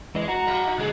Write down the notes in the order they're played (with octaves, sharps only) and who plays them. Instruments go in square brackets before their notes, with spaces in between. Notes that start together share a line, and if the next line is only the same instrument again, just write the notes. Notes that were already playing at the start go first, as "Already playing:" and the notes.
[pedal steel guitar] E3 D#5 [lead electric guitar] G#3
[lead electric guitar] F#4 [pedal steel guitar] F#5 A#5
[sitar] G2 F#3
D#4
[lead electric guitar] D3 G#3 [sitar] F3 G#4 [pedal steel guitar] F#6